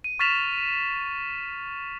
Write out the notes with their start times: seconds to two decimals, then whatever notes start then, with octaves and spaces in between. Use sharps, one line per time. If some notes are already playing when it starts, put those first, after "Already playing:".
0.04 D#7
0.19 C#6 F6 A6 B6 E7 F7